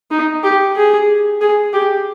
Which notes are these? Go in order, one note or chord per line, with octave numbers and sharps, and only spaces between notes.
D#4
G4
G#4
G#4
G4